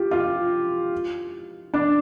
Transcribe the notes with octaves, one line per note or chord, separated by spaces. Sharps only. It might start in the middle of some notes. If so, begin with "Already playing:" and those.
Already playing: F4 G4
F4
D4